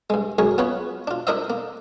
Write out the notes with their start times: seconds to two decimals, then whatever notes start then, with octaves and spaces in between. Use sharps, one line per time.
0.10 G2 G#3
0.38 F#2 G#3 G#4 A#4 C#5
0.58 B3 F4 B4 C#5
1.07 D4 F4
1.27 D4 E4 A#4 C5 D#5 E5
1.50 A#3